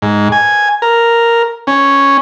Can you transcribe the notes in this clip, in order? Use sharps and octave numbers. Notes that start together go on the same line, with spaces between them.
G#2
G#5
A#4
C#4